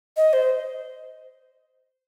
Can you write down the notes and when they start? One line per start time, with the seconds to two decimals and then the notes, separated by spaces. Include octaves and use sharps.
0.17 D#5
0.33 C5